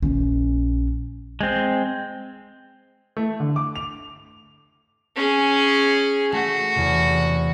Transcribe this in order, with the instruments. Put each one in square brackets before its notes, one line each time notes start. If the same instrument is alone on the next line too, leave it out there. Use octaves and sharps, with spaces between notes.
[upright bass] A#1 C#4
[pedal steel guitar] G#3 C4
[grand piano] A3
D3
D6
F7
[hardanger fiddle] C#4 G#4
[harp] A3 [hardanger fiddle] F#4
[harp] E2 C3